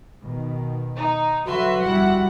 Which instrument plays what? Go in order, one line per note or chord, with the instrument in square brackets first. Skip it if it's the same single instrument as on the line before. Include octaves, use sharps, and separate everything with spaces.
[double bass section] B2 D#3
[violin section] D#4
[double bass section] D3 F#3 [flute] F#4 [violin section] B4 E5 C6
[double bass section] G1 F2 G3 [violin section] E4 F#5